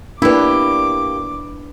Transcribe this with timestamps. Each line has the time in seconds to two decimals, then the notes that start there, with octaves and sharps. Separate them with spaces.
0.22 A#3 D4 E4 G4 B4 D6